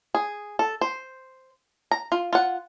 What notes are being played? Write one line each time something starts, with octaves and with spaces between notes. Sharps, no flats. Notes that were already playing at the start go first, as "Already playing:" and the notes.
G#4
A4
C5
A#5
F4
F4 F#5